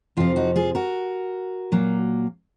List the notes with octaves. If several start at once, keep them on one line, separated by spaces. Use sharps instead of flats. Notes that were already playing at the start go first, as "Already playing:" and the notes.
F2 C3 F3 F4
D#4 F#4
F4 G#4
F#4 A#4
A#2 F#3 A#3